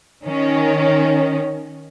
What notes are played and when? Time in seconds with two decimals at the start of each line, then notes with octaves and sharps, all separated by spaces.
0.24 D#3 C#4